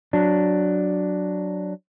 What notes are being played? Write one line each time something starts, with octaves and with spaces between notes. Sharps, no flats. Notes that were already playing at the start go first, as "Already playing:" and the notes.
F#3 D4